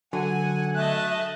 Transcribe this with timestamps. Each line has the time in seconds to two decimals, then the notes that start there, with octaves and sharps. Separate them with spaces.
0.13 D3 F#3 F#5 G#5
0.75 A3 D#5 E5 A5 F#6